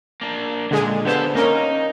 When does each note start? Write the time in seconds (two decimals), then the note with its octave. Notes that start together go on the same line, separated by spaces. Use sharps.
0.21 A#3 D4
0.71 A#2 D3 G#3 G#4
1.05 D3 B3 G4 A4 C5
1.35 A#3 C#4 D#4 A#4